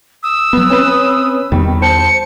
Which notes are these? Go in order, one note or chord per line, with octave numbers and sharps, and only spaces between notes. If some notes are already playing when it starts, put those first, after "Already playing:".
D#6 E6
F#3 B3 B4
C4 C#4 B4
E2 D#3 G3
C5 A5 C#7